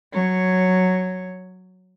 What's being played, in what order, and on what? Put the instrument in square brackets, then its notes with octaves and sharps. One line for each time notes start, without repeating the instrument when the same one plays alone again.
[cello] F#3 C#5